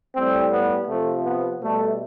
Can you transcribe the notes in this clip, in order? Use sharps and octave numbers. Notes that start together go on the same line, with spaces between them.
A2 G3 C4
B3
C3 F3 A3
B3
B2 G3 A3